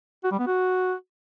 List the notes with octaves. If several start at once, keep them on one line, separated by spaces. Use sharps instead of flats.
F#4
G3
B3
F#4